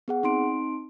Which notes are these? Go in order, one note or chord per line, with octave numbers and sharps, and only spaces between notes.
B3 G#4 F#5
C4 D#4 C6 D7